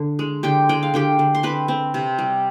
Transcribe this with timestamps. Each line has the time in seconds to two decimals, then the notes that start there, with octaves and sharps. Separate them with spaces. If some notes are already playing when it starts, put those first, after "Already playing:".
Already playing: D3
0.19 G#3
0.43 D3 G4 G5
0.69 G#3 G5
0.83 F5
0.94 D3 G4 G5
1.19 D3
1.35 C6
1.43 C4 B4 B5
1.68 C4
1.94 C3
2.18 G3